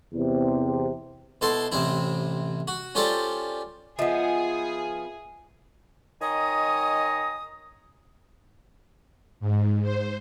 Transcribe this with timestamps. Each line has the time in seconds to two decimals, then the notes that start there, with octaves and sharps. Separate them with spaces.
0.14 E2 C3
1.41 B2 E4 A4 C6
1.72 A1 C3 C4 E4
2.68 F#4
2.95 C#4 F4 G4 A4 C5 D5
3.99 F3 B3 F4 G#4 D#5 E5
6.22 D#3 C#5 D#5 G#5 A#5 D#6
9.40 G#2
9.83 C5